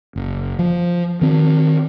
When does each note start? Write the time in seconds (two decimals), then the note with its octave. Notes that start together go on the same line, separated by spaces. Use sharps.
0.16 F#1
0.59 F3
1.21 D#3 C4